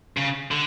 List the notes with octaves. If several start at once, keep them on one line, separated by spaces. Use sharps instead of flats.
C#3
D3